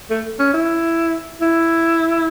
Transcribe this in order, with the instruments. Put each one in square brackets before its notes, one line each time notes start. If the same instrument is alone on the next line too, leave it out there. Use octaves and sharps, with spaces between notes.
[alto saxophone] A3
C#4
E4
E4